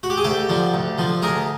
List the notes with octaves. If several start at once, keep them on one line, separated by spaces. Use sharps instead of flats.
F#4
G4
G#4
D2 G4 A4
D3 F3
D2
D3 F3
D2 G#4 A#4